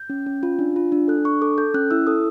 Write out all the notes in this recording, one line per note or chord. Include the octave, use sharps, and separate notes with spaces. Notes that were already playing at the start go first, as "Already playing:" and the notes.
Already playing: G6
C#4
C#4
F4
D4
F4
D4
A4 F#6
D4 C#6
A4 D6
A4 G6
C#4 F#6
E4 E6
A4 D#6